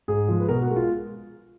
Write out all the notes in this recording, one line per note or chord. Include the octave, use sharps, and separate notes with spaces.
G#2 G#4
F3 G#3
B4
B2 A#4
F#4
G#3
F4